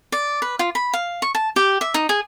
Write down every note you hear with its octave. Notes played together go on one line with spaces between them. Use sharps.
D5
B4
F4
B5
F5
C#6
A5
G4
E5
D#4
G#4